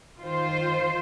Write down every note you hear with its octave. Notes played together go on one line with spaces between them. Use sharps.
D#3 F4 C5